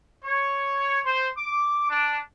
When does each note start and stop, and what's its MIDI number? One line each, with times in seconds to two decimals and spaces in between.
0.24 0.99 73
1.04 1.27 72
1.36 1.87 86
1.90 2.18 62